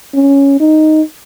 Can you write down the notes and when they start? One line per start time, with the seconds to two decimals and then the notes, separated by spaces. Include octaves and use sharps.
0.14 C#4
0.60 D#4